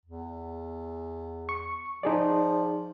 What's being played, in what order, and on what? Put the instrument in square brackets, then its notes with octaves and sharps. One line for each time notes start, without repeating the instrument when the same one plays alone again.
[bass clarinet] E2
[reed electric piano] C#6
[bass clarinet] F3 [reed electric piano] D#4 G#4 D5